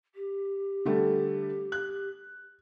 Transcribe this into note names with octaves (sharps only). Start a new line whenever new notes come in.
G4
D3 G3 A3
F#6